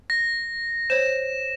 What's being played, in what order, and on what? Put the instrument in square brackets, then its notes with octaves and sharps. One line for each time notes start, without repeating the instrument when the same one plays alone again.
[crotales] A#6
[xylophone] C5 C#5 [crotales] E7